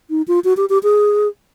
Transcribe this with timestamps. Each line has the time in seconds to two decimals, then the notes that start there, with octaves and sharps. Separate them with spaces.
0.10 D#4
0.28 F4
0.44 F#4
0.57 G4
0.69 G4
0.83 G#4